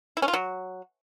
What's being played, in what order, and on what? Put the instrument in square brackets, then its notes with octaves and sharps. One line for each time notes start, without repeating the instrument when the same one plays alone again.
[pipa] E4
C#4
F4
F#3